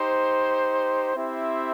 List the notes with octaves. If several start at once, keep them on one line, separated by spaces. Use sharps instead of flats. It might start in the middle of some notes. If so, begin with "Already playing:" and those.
Already playing: D#4 G4 C5
C4 E4 G4 C5 E5